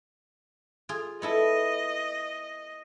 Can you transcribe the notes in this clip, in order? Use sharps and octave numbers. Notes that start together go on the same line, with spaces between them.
F4 G#4
B3 E4 A4 D#5